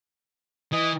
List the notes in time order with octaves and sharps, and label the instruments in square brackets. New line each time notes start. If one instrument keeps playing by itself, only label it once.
[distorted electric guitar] E3 [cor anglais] D#5